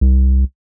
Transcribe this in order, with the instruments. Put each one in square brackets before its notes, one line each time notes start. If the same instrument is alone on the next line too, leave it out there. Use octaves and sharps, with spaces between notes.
[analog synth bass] C2